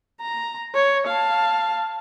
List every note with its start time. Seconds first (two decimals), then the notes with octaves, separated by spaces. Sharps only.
0.21 A#5
0.75 C#5
1.07 F5 A5